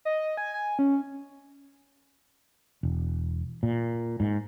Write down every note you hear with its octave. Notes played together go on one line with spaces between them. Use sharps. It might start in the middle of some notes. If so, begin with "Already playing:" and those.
D#5
G#5
G#5
C#4
E1
A#2
G#2